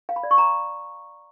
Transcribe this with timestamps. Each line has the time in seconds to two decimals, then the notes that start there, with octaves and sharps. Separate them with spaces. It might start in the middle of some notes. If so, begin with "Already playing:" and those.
0.09 F5
0.16 B5
0.23 D5
0.31 C#6
0.38 A#5